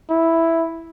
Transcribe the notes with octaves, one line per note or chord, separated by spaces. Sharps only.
E4